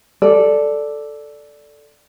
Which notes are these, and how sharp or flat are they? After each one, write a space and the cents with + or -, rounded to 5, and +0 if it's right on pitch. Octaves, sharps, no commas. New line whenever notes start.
A4 +0 D5 +0